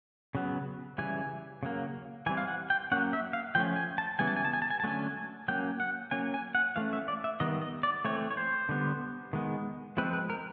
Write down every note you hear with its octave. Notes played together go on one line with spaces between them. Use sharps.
C#3 F#3 B3
C#3 E3 G3 G#5
C#3 F#3 A#3
E3 G3 C4 G#5
F5
F#5
G5
F#3 A#3 C#4 F#5
E5
F5
F3 A3 C#4 G5
G#5
A5
C#3 E3 G3 B3 G#5
A5
G#5
A5
G#5
A5
G#5
A5
D3 F#3 A3 C#4 G#5
F#3 A#3 C#4 G5
F#5
F#3 A#3 C#4 G#5
G#5
F#5
E3 A3 C#4 F5
E5
D5
E5
D#3 G3 B3 D#5
D#5
D5
E3 A3 C4 C#5
C#5
C5
D3 G3 B3
D#3 G#3 B3
F3 G#3 C4 B4
B4
A#4